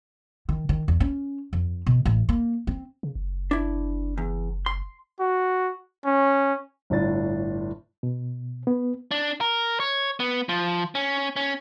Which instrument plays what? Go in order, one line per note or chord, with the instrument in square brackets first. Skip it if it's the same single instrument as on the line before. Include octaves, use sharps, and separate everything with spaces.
[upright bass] D#3
D#3
E2
C#4
F2
B2
A1
A#3
C4
[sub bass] C#3
F#1
[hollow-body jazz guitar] D4 E4
E2
C6
[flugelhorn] F#4
C#4
[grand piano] G1 A2 D4 A6
[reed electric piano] B2
B3
[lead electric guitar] D4
A#4
C#5
B3
F3
C#4
C#4